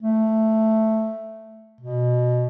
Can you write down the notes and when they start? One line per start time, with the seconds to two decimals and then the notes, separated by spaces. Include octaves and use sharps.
0.02 A3
1.81 B2